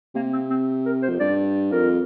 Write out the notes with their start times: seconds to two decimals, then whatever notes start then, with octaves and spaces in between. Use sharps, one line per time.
0.15 C3 A#3
0.33 C4
0.50 C4
0.86 A#4
1.03 C5
1.09 F2
1.19 G2 D5
1.71 F2 A#4